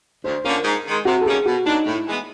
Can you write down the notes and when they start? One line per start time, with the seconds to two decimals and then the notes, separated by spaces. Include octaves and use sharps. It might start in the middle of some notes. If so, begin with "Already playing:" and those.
0.24 D2 C5
0.44 D3 F3 A#3 C#4 A#4
0.64 G#2
0.85 D#3 G#3
1.05 C3 F#4
1.21 A4
1.25 D#3 G3 A#3 C#4 G#4
1.46 B2 F#4
1.66 F#3 A#3 D4 D#4
1.86 A2 E4
2.06 E3 G#3 B3